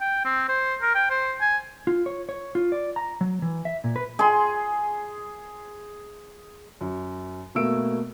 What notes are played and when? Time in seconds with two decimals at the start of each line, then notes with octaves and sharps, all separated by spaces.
0.01 G5
0.25 C4
0.49 C5
0.82 A#4
0.95 G5
1.10 C5
1.41 G#5
1.87 F4
2.06 C#5
2.29 C#5
2.55 F4
2.72 D5
2.96 A#5
3.21 F#3
3.42 E3
3.65 E5
3.84 A#2
3.96 B4
4.19 G#4 C6
6.81 F#2
7.55 B2 A3 A#3 E6 D7